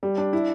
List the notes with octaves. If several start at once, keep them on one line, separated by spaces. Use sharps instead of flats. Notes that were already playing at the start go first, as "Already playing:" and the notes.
G3
D4
E4